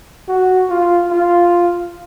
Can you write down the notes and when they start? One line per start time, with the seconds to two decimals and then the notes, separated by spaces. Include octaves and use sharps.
0.28 F#4
0.70 F4
1.11 F4